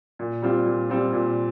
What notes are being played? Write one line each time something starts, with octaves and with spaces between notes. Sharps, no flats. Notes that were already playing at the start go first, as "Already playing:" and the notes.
A#2
G3 C4 F4
A#2
G3 C4 F4
A#2